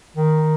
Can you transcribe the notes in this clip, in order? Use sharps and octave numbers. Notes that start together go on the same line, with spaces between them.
D#3